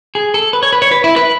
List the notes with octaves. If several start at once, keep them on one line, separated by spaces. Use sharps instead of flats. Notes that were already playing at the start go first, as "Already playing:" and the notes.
G#4
A4
B4
C#5
B4
C#5
B4
E4
B4